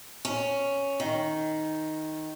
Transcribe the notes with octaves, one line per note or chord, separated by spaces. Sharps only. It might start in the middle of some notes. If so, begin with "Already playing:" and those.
C#4
D#3